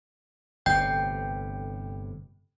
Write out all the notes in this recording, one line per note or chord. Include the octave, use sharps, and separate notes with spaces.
G1 A2 C3 G5 G6